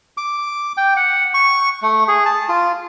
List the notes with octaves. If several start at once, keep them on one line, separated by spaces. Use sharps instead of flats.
D6
G5
F#5
C#6
A3
G#4
A5
F4